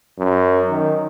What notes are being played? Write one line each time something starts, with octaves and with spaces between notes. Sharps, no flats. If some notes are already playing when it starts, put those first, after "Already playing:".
F#2
D#3